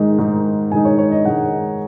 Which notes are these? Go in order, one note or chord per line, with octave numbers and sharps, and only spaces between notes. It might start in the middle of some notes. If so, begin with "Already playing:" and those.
Already playing: G#2 D#3 G#3 D#4
G#2 D#3 G#3 D#4
G#2 D#3 G#3 D#4 G#5
C#5
C#5
D#5
G#2 D#3 G#3 D#4 F#5